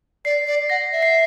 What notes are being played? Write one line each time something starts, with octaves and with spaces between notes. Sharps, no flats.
D5 C7
D5
F#5 A#6
E5
C7